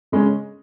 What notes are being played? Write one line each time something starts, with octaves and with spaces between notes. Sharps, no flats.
C#3 G#3 C#4